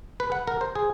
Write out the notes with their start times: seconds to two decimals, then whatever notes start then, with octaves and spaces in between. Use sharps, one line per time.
0.20 B4
0.32 F#5
0.47 A#4
0.61 C5
0.75 G#4